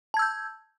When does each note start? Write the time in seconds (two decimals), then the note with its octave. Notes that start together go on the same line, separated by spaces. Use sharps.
0.14 A5
0.17 G#6
0.19 E6
0.22 G6